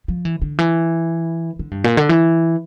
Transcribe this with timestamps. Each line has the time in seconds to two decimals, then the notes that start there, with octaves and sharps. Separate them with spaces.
0.08 F3
0.25 E3
0.42 D3
0.59 E3
1.59 D3
1.71 G2
1.84 A#2
1.97 D3
2.09 E3